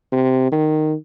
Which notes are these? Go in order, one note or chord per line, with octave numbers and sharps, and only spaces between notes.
C3
D#3